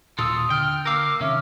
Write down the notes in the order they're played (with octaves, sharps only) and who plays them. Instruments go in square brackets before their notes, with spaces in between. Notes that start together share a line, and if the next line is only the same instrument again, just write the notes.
[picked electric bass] D#1 A#2 [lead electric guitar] F4 A4 [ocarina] D#6 [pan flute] E6
[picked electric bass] D3 [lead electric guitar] G5 [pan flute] F6
[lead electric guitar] A#4 F5 [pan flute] D6 [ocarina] E6
[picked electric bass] C3 D#3 C4 [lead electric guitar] C#4 [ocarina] E5